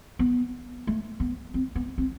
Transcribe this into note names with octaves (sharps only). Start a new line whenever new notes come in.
B3
A3
B3
C4
B3
C4